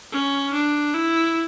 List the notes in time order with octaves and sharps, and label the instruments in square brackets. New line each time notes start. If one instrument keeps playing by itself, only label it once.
[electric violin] C#4
D4
E4